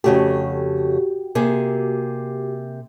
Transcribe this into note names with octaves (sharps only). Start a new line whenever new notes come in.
F2 C#3 A3 F#4 G4
C3 A#3 G#4